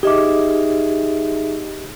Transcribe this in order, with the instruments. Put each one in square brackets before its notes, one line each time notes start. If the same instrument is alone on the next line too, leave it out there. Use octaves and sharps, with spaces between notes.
[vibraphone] D#4 G#4 E5 [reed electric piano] G4 D#5 D6